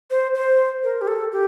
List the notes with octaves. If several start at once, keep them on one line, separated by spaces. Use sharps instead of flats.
C5
C5
A#4
G4
A4
G4